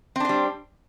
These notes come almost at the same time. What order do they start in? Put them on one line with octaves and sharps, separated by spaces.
C4 D4 C5 G3